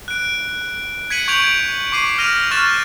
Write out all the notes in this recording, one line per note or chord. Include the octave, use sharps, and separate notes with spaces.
F#6 D7
G#6 B6 C#7 D#7 F#7
C#6 G6 G#6 D7 F7 F#7
C#6 D6 C7 D#7
F6 A#6 D#7 F7
C#6 F6 F#6 A6 E7